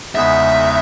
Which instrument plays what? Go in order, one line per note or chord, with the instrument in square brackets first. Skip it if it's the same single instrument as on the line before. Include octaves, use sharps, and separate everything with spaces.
[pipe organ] E2 C#3 G#3 B3 D#4 [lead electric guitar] E5